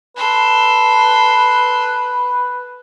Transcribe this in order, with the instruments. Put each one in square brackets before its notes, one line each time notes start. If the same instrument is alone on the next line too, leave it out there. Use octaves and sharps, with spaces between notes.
[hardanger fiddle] A4 C6 [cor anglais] B4